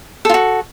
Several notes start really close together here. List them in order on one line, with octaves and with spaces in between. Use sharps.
A4 F4 F#4